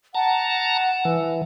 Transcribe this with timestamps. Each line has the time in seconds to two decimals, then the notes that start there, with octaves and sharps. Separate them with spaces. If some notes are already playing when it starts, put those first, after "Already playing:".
0.15 F#5 A5 A#5
1.05 E3